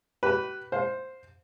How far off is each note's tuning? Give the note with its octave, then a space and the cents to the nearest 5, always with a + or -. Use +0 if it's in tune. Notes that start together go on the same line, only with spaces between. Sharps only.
G4 -40 B4 +0
C5 +0 F5 +30